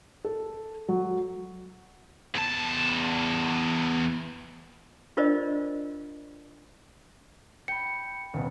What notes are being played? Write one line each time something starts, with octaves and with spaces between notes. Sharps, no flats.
A4
F#3
E2 A5
D4 F4 A#4 C5 D5 D#5
G5 B5 C#7
D#1 B2